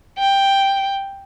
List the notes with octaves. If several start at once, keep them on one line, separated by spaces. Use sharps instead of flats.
G5